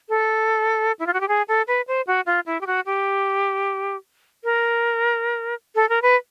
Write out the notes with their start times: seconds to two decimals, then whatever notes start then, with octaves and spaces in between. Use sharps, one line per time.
0.09 A4
0.99 E4
1.07 F4
1.13 F#4
1.20 G4
1.28 G#4
1.48 A4
1.67 B4
1.88 C5
2.07 F#4
2.26 F4
2.46 E4
2.61 G4
2.67 F#4
2.86 G4
4.44 A#4
5.75 A4
5.89 A#4
6.02 B4